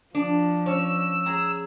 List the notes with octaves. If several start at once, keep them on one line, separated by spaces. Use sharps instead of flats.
F3 D4
C#4 E6
G#4 A#5